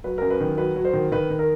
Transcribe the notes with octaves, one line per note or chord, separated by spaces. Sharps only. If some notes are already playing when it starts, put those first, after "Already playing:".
F#3 B4
F#2 A#4
B4
D#3
F#3 B4
F#3
C5
D#3
D#3 B4
D#3
A#4